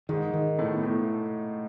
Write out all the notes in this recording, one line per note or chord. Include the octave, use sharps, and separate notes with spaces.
G#2 D#3 G#3
D#3
A2 A3 B3
A2 A3